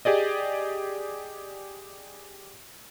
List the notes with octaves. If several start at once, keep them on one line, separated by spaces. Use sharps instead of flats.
G4 G#4 D5 D#5